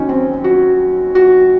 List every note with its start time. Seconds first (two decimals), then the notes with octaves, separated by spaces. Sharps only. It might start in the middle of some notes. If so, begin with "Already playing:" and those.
Already playing: D#2 D#3 F#3 C#4 D#4
0.09 C4
0.44 F#4
1.15 F#4